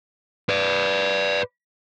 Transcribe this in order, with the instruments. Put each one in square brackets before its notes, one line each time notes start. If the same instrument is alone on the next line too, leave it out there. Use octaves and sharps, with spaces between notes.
[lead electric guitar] B4 D5